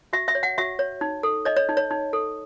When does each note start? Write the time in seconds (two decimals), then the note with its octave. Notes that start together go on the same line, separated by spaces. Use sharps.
0.13 F#4 E5
0.28 E5
0.35 C#5
0.43 F#5
0.58 F#4 E5
0.79 C#5
1.01 D#4
1.23 A4
1.45 C#5 D#5
1.56 C#5
1.69 D#4
1.77 C#5
1.91 D#4
2.13 A4